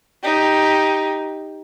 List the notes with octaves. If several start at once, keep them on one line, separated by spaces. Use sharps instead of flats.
D#4 G4